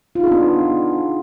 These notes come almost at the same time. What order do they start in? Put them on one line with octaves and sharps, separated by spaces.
F4 D#4 G#4 D4 B3